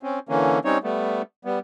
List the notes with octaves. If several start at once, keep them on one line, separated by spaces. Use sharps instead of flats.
C4 C#4
D3 E3 A#3 C#4
G3 C4 C#4 D#4 C#5
G3 A3 B3
G3 B3